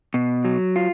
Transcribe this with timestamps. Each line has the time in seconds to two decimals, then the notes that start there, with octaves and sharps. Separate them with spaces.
0.14 B2
0.45 F#3
0.76 F4